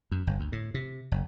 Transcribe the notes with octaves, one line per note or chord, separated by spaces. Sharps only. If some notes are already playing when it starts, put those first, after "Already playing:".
F#2
G1
D2
A2
C3
F#1